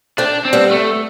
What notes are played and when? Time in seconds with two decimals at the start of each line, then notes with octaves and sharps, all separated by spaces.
0.18 A3 C4 D4
0.45 C4
0.53 G3 B3
0.71 A3